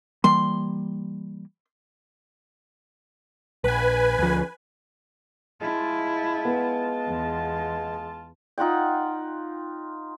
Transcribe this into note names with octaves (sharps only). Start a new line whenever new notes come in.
E3 G3 A#3 C6
A#1 B4 G#5
D2 F3
G#3 E4 F4 A5
B3
E2
D#4 F4 F#5 G5